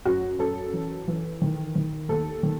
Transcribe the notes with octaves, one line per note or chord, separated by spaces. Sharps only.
F#2 F#4
F#2 A4
E3
E3
D#3
D#3
D#2 A4
D#3